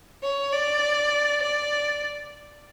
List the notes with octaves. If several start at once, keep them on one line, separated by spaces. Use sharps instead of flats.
C#5
D5
D5